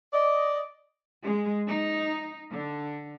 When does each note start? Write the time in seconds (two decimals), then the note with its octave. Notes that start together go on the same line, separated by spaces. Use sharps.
0.14 D5 D#5
1.22 G#3
1.68 D#4
2.50 D3